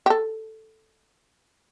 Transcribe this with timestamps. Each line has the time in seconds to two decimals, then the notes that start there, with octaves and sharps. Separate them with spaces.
0.06 G4
0.10 A4